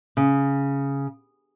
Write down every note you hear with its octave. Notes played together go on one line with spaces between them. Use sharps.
C#3